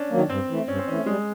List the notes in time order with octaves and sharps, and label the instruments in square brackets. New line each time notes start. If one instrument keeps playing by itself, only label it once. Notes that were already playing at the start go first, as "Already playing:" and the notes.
Already playing: [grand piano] C#4 D4
[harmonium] D#3 F#3 A#3
[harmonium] G2 [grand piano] C4
[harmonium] E3 A3
[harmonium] G2 [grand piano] C#4
[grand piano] C4
[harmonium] E3 [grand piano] C#4
[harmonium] A3
[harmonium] G3 [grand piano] G#3